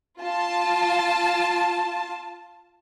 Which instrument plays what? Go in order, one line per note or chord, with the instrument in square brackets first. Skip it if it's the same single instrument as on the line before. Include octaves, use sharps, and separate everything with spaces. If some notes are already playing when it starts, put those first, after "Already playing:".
[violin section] F4 A5